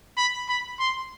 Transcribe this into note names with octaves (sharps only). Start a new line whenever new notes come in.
B5
B5
C6